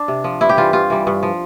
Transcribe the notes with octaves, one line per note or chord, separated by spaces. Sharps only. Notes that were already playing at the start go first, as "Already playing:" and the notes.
Already playing: D4
C3
F3
G2 E4
G4
E3 G3 F4
G2 F4
E3 G3
G2
F3